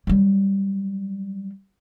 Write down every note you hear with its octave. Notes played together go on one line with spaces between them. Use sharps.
F#3 G3